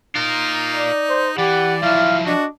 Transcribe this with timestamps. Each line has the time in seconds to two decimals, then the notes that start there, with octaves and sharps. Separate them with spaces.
0.15 D#4 F4 A#4
0.75 D5
1.09 C5
1.38 E3 G4 D5 F#5
1.83 F3 F#3 E4 F5
2.27 D4 F#4 D#5